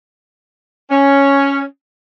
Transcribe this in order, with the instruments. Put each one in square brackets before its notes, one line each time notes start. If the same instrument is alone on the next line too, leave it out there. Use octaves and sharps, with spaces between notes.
[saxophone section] C#4